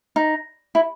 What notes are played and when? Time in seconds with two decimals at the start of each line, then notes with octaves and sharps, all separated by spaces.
0.16 D#4
0.75 E4